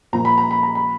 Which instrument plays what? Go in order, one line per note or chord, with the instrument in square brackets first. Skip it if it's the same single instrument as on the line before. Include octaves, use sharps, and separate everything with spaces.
[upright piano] A#2 F3 A#3 [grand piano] A#5
[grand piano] B5
A#5
B5
A#5
B5